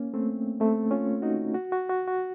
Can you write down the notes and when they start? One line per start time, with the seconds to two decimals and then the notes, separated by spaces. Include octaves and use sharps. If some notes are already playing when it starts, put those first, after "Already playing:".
Already playing: A#3 C#4
0.14 A3 C4
0.60 A3 C4
0.91 C#4 F4
1.22 D#4 F#4
1.54 F#4
1.72 F#4
1.90 F#4
2.07 F#4